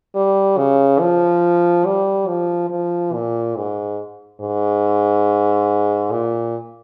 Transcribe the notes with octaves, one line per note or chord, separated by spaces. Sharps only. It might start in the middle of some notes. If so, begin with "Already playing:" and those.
G3
C#3
F3
G3
F3
F3
A#2
G#2
G#2
A#2